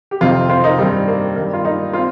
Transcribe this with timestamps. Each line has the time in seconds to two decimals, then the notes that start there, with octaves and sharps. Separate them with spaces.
0.11 G4
0.21 F2 C3 D#3 C4 F4
0.49 C4 F4
0.64 A#3 D#4
0.79 G2 D#3 G3 C4
1.08 A#3
1.36 D#3 A#3
1.40 G2
1.53 F4
1.65 A#3 D#4
1.93 C4 F4